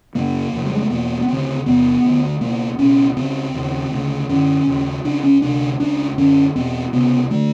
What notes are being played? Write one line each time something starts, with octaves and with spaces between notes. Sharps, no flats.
F#2 C#3 A#3
F2 C#3
G3
G#3
A3
E2 B2 A#3
B3
D2 C#3 C4
E2 C3 B3
D2 D3
C#2 B2 A#3
C#2 B2 C#4
C#2 C#3 C4
D#2 C#3
D2 C#3
F#2 D3 C#4
D#2 C#3
C#2 C#3 D4
C#4
D2 C3 D4
C#2 C#3 D4
F#2 D3 C#4
E2 B2 C4
C#2 C3 B3
D3 A3